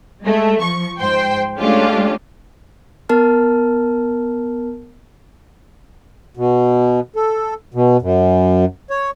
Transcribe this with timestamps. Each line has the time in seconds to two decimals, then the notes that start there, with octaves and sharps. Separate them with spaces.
0.23 G#3 A3
0.61 F3 C#6
1.00 G#2 C5 G5 C6
1.59 G#3 A3 C#4 D4 F4 G4
3.09 B3 A#4 A5 F6
6.37 B2
7.16 A4
7.74 B2
8.02 F#2
8.90 C#5